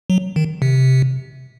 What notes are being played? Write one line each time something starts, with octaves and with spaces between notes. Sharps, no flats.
F#3
D#3
C3